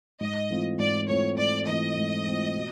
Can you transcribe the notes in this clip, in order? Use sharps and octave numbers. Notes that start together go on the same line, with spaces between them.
G#2 D#5
E3 A3 C4 F4
G#2 D5
E3 A3 C4 F4 C#5
G#2 D5
E3 A3 C4 F4 D#5
G#2
E3 A3 C4 F4
B2